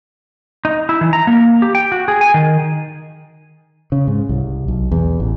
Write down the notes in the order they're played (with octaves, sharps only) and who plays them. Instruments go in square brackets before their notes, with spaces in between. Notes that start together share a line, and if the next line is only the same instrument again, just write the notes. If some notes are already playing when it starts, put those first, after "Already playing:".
[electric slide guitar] D#4
E4
E3
A#5
A#3
G4
G5
F#4
G#4
G#5
D#3
[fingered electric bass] C#3
G#2
C2
B1
E2
A1